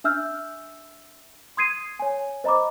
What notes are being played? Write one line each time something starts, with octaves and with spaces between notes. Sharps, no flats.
D4 E5 E6 F6 G6
C6 D#6 G#6 C7 D#7
C#5 G#5
C5 D#5 A#5 B5 D6